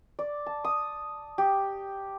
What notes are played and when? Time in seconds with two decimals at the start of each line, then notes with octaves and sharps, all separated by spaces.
0.19 D5
0.46 A5
0.64 D#6
1.38 G4